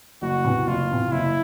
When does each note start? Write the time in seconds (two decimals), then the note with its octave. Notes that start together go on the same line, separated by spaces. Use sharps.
0.22 F#1 F#4
0.44 E2 C3
0.67 F#1 F4
0.90 E2 C3
1.12 F#1 E4